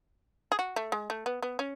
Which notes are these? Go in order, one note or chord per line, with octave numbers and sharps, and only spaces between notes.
G#4
F#4
A3
G#3
A3
B3
B3
C#4